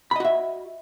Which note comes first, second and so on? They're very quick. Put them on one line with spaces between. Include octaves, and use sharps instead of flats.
B5 D#5 F#4 E5